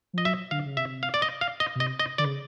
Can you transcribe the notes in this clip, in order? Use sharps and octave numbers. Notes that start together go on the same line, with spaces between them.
F3 D#5
F#3 E5
D3 F5
C#3
C3 E5
F5
D5
D#5
F5
D#5
B2
C3 D#5
D#5
D3 D5
C#3